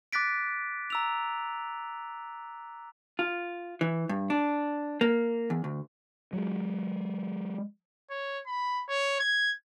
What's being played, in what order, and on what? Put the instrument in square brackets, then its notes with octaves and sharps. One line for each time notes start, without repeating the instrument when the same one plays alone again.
[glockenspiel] D6 F#6 A6 B6 D7
A#5 E6 F7
[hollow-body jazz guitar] F4
E3
G2
D4
A#3
E2
D2
[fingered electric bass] F#3 G#3
[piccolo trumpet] C#5
B5
C#5
G#6